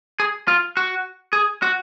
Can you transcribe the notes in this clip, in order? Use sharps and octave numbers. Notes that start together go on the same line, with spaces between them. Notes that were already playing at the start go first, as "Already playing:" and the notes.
G#4
F4
F#4
G#4
F#4